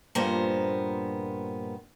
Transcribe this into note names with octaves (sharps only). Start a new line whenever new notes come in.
G2 A#2 F3 A#3 B3 C5